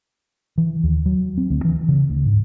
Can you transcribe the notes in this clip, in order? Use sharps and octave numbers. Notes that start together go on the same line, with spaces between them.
E3
D#2
F#3
C4
D2
E3
C#3
D2
G#2